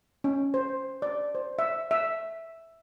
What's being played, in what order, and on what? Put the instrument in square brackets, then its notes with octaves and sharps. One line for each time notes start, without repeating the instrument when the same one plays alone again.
[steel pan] C#4
C5
D5
C5
E5
E5